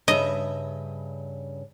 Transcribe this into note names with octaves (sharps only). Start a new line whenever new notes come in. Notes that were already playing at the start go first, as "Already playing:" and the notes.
G2 C#3 D#5 E5